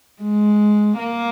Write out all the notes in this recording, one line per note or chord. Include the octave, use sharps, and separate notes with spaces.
G#3
A#3